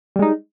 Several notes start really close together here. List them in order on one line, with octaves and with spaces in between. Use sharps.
G3 G#3 D#4